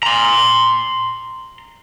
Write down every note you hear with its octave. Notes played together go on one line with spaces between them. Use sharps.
A#5 C6